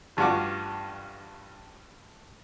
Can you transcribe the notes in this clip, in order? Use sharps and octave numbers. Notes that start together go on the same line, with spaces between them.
A1 G2 F4 F#4 D6